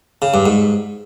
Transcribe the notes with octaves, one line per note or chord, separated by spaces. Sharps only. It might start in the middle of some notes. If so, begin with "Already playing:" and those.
C#3
G2
G#2